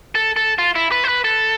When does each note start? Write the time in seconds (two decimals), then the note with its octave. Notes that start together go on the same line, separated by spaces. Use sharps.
0.15 A4
0.36 A4
0.58 F4
0.75 E4
0.92 B4
1.04 C5
1.08 B4
1.24 A4